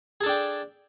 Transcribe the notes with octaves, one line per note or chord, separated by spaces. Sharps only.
D4 G#4 A4 G5